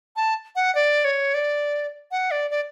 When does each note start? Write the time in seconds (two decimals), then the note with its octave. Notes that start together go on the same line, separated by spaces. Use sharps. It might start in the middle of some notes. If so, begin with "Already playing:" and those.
0.16 A5
0.56 F#5
0.75 D5
1.05 C#5
1.34 D5
2.11 F#5
2.31 D5
2.51 D5